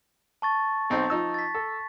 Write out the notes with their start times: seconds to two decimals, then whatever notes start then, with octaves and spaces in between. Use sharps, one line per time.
0.42 A5 C#6 A6
0.90 B1 C4 D#4
1.10 F3 D#4 E6
1.34 A6 B6
1.55 A4